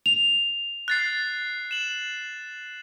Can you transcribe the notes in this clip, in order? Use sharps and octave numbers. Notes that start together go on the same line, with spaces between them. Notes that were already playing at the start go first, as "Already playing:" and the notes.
F7
F#6 A6 C7
E7 F#7